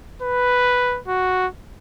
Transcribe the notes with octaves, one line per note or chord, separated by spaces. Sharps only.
B4
F#4